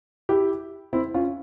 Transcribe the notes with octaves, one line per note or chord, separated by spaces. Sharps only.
E4 G4
C4 E4
C#4 F4